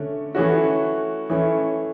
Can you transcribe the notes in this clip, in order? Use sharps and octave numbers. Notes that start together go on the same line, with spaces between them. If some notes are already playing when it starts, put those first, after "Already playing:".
Already playing: D3 A3 C#4
E3 A3 C#4 F#4
E3 A3 C#4